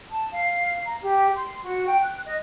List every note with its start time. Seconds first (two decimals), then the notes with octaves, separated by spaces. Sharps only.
0.11 A5
0.31 F5
0.85 A#5
1.02 G4
1.35 C6
1.62 F#4
1.86 G5
2.02 F#6
2.25 D#5